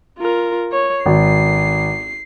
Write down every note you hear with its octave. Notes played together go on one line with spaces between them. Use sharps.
F4 A#4
C#5
G#1 C7